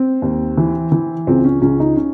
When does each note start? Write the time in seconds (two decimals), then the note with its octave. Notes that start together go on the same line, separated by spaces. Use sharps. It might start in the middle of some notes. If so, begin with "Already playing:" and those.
Already playing: C4
0.22 D#2
0.57 E3
0.92 E3
1.27 C#2 C4
1.44 C#4
1.62 C#2 C#4
1.80 D#4
1.96 C#4